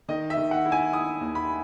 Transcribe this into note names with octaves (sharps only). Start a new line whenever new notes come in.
D#3 D#5
E5
D#3
F#5
E4
G#5
E4 D#6
D#2
B5